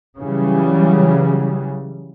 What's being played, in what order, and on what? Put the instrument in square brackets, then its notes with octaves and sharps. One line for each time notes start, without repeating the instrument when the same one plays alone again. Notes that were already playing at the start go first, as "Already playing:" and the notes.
[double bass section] C#3 E3 F#3 G3